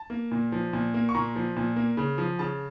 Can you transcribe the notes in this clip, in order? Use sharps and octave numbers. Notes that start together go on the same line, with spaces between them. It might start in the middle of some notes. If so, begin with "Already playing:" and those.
Already playing: A5
A#3
A#2
F3
A#2
A#3
C#6
A#2 A#5
F3
A#2
A#3
C#3
F3
C#3 A5